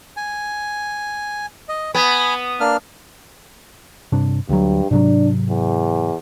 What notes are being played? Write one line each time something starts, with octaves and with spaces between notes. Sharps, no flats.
G#5
D#5
B3 G#5 B5
A#3 D4 F6
G2 C3 D4
D2 G2 F#3
G#2 C3 F#3 D4
E2